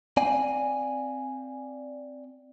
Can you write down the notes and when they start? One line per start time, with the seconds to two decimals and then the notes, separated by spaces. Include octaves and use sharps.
0.17 C4 D5 F5 G5 G#5